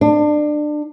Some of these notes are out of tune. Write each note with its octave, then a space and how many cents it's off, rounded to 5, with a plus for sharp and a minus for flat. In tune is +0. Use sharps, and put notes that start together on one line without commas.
D4 +25